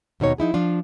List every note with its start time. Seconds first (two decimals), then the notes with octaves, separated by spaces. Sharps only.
0.20 D#2 B2 D#4 C#5
0.38 F3 D#4 E4 G#4
0.54 F3 D4 F4